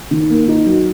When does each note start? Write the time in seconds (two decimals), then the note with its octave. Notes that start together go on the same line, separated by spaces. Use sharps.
0.11 D#3
0.30 A#3
0.48 D#4
0.66 F#3